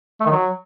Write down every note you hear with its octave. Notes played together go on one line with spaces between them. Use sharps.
A3
D#3
F#3